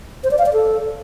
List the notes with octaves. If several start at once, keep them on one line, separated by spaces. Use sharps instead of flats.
C5
D5
F5
D5
A4